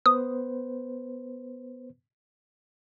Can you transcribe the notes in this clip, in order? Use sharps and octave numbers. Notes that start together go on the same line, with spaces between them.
B3 B4 C5 D#6